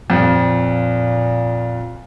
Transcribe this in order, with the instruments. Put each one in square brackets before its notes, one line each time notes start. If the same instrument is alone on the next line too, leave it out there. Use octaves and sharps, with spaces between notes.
[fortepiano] F2 [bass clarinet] A#2